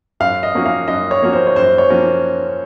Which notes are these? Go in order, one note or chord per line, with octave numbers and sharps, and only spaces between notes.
F#2 F5
D#5
F3 A#3 C#4 F#4
F5
F#2 D#5
C#5
F3 A#3 C#4 F#4
C5
C#5
F#2 C5
C#5
F3 A#3 C#4 F#4